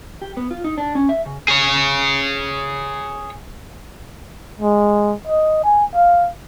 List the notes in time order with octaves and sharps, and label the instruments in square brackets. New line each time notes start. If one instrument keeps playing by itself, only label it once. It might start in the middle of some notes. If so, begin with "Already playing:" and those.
[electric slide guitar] G4
B3
F4
D#4
D4
C#4
E5
C#3
[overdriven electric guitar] G#4 C#5
[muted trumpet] G#3
D#5
G#5
F5